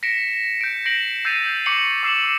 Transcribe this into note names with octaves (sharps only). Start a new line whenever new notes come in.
A#6 B6 C#7 D7 E7
G6 D7
A#6 C7 D7 E7 F#7
E6 G6 A6 C7 D#7 F7
C#6 D6 G6 C7 C#7 F#7
D6 E6 C7 E7 F#7